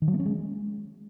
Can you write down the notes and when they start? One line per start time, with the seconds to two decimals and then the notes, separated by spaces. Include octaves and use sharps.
0.02 D#3
0.08 F#3
0.14 A#3
0.20 C#4
0.25 G#3